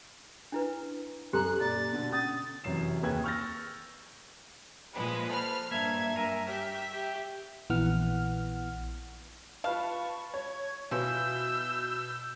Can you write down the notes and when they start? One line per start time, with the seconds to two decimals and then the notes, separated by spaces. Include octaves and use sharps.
0.52 D4 E4 B4
1.33 F#2 G4 A4 A#5 C6 F#6
1.60 A#2 D5 A#5 A6
1.93 B2 D3
2.12 C#4 D#6 A6
2.64 F1 F#2 E3 C#4 C7 E7
3.03 D#2 G#4 B4 G5 G#6
3.24 C#6 E6 F6 G6 A6 A#6
4.94 A#2 F3 G#3 B4
5.31 A4 C5 F6
5.71 G2 A#3 E5 A5 G#6
6.16 A#4 E5 G#5 A#5
6.47 G4 E5 F6 B6
6.92 G4
7.70 A#1 E3 B3 F#5 F6
9.64 F4 B4 F5 A5 C#6
10.34 C#5 G#6
10.91 B2 E3 F3 E6 G6